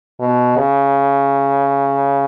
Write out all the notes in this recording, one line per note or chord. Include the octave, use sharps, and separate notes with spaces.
B2
C#3